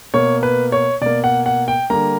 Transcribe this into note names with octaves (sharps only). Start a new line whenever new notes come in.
B2 A#3 C#5
B4
C#5
B2 A#3 D5
F#5
F#5
G5
D3 G3 A#3 A#5